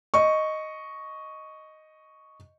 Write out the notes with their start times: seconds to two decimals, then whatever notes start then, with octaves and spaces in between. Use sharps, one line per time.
0.14 D#5 C#6